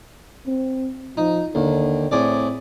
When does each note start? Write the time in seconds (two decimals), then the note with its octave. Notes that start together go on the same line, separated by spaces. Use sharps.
0.47 C4
1.17 F3 D#4
1.55 D#2 D3
2.11 A2 C4 G#4 D5